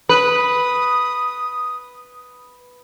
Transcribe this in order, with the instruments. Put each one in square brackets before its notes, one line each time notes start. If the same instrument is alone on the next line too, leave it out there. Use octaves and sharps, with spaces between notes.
[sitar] B4 [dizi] D#6